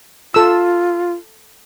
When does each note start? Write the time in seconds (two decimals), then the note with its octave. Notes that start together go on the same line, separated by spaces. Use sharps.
0.34 F4 A4 E6